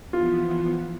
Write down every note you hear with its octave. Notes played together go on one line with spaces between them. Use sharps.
E3 F3 B3 F4